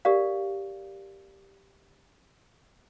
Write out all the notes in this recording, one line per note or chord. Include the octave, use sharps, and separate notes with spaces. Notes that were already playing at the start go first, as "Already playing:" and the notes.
G4 A#4 D5 F5